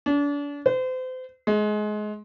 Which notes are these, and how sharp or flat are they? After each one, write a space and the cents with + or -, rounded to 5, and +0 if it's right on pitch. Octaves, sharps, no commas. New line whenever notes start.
D4 -35
C5 -35
G#3 +25